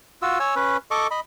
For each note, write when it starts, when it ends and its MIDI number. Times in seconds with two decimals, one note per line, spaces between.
0.22 0.39 65
0.22 0.39 66
0.22 0.39 88
0.40 0.55 73
0.40 0.55 80
0.40 0.55 88
0.56 0.77 61
0.56 0.77 71
0.91 1.07 69
0.91 1.07 75
0.91 1.07 85
0.91 1.07 86
1.11 1.20 75
1.11 1.20 83